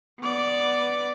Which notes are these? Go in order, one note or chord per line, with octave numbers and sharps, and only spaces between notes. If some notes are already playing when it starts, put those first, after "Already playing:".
B3 D5